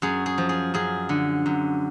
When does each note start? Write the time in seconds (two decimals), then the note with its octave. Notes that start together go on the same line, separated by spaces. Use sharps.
0.02 F#2 G#4
0.26 G#4
0.38 F3
0.49 G#4
0.74 F#2 G#4
1.09 D3
1.46 F#2